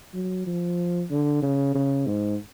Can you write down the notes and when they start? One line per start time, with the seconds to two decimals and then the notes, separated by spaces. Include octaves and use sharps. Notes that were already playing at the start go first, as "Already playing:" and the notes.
0.14 F#3
0.46 F3
1.10 D3
1.43 C#3
1.75 C#3
2.07 G#2